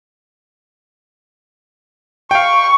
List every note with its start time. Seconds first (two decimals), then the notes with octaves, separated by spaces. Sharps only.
2.31 F5 G5 C#6